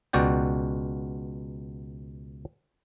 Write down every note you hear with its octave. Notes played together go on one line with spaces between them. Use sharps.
C#2 B2 F#4 D5 G5